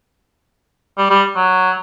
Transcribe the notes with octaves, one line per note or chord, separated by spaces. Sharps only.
G3
G3
F#3